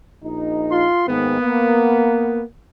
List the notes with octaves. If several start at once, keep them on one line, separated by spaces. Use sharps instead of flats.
A#1 D#4
F4 C6
G#2 D#3 A#3 B3
A#3